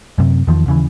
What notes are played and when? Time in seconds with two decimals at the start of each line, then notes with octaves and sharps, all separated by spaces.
0.18 F#2 C3
0.47 E2 D#3 F3
0.66 D#2 C#3 E3